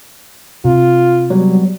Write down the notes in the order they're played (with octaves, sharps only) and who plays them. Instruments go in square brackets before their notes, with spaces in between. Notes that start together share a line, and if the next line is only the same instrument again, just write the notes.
[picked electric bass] C3 [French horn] F4
[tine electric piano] F#3 G3 B3